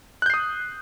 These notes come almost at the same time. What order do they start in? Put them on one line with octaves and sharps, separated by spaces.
F#6 G6 C7 D#6